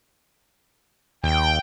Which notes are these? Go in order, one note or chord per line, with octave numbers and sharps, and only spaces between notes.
D#2 G5